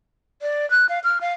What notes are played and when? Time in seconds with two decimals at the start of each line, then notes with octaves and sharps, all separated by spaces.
0.42 D5
0.71 F#6
0.89 F5
1.04 F6
1.21 F5